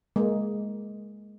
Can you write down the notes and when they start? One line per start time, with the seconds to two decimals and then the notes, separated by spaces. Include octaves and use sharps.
0.16 G#3 A#3